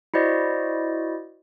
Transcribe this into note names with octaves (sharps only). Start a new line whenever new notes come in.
E4 F#4 C5 D5 D#5